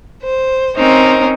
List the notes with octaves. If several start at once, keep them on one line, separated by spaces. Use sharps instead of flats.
C5
C4 C#4 D#4 A#4 C5